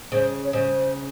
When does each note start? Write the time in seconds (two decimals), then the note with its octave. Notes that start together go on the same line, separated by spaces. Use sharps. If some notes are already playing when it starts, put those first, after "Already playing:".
0.12 C#3 C5
0.44 C#5
0.53 C#3 C5